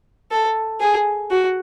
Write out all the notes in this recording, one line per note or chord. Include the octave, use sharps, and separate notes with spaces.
A4
G#4
F#4